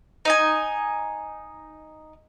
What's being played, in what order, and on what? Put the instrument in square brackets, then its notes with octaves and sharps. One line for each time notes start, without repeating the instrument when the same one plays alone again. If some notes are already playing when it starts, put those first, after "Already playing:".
[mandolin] D#4 D#5 G#5